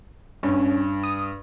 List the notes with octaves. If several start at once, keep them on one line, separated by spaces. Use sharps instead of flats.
G2 C#4
D#6